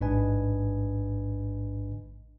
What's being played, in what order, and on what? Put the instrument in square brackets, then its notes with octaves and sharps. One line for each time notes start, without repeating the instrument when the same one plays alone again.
[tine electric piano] A1 G#2 D4 B4 D#5 G#5